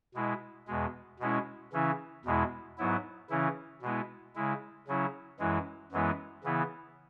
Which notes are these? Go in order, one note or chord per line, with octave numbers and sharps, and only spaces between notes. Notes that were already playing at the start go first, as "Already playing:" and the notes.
B2 G#3 E4
E2 B2 G#3
B2 G#3 C#4 E4
C#3 E3 C#4 E4
E2 B2 G#3 E4
G#2 F#3 B3 E4
C#3 E3 C#4 E4
B2 G#3 B3 E4
C#3 G#3 E4
C#3 F#3 C#4 E4
F#2 E3 G#3 E4
F#2 E3 G#3 B3 E4
C#3 E3 B3 E4